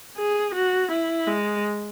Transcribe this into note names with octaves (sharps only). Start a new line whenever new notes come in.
G#4
F#4
E4
G#3